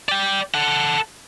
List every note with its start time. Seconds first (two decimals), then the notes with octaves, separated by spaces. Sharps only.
0.09 D5 G5
0.54 A4 F#5